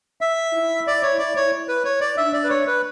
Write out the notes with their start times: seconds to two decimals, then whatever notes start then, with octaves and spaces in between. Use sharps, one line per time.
0.21 E5
0.54 E4
0.87 D5
1.03 C#5
1.19 D5
1.36 C#5
1.68 B4
1.85 C#5
2.01 D5
2.17 D4 E5
2.33 D5
2.44 B4
2.50 C#5
2.67 B4